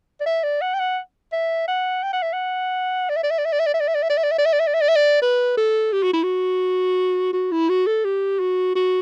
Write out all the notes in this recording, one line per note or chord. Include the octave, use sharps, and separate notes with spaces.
D5
E5
D5
F#5
G5
F#5
E5
F#5
G5
F#5
E5
F#5
D5
E5
D5
E5
D5
E5
D5
E5
D5
E5
D5
E5
D5
E5
D5
E5
D5
E5
D5
E5
D5
E5
D5
E5
D5
E5
D5
B4
A4
G4
F#4
E4
F#4
F#4
E4
F#4
A4
G4
F#4
F#4